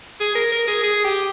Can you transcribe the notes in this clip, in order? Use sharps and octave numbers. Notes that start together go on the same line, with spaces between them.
G#4
A#4
A#4
G#4
G#4
G4